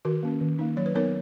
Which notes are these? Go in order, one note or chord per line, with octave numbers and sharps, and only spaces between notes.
D#3 F#4 A#4
A#3 C#4
D#3
A#3 D#4
F#3 C#5
B4
B3 D#4 A#4 C#5